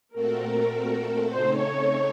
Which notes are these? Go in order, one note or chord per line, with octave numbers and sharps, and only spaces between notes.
A#2 A3 C4 F#4 A4 A#4
C#3 A3 C4 D#4 A4 C5
C#5